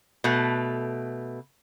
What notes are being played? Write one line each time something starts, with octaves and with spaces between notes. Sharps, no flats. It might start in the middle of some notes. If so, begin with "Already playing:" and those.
B2 A3